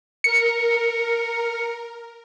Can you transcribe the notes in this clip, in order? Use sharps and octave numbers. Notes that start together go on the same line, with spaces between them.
A#4 C#7